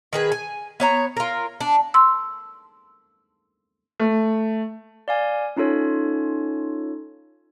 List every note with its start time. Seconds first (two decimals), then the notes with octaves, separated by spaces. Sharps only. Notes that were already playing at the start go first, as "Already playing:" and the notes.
0.13 D#3 G#4 B4
0.32 G#5
0.80 B3 C#5 A#5
1.17 F4 A#4
1.60 D4
1.94 C6 E6
4.00 A3
5.08 D5 F5 G#5
5.57 C#4 D#4 F4 A4 C#5